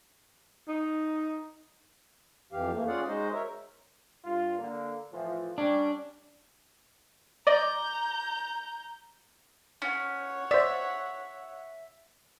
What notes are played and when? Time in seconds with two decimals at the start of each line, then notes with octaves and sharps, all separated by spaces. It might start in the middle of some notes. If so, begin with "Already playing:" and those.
0.68 D#4
2.52 F2 E3 G4 F5
2.72 E3 A3 A#3
2.88 C#4 F4 G#4 D5 F5 F#5
3.07 G#3 D#4 F#4 C5 D#5
3.33 A#4 C#5 E5
4.25 G2 F4
4.59 D3 A#3
5.12 A2 E3 F3
5.58 G3 C#4 D4
7.47 D5 D#5 A#5 D6 G6
9.82 C#4 C#5 F#5
10.51 C5 D5 E5